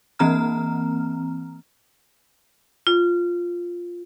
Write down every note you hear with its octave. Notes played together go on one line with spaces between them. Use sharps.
E3 A#3 C4 A#5 F6
F4